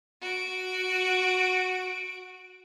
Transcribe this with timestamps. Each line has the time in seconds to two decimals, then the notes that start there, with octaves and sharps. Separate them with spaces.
0.21 F#4 D7